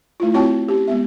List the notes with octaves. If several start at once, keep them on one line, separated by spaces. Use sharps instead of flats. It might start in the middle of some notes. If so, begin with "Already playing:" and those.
A3 E4 F4
C4 E4 F#4 C#5 G5 A5
C#4 G4
G#3 B3 E5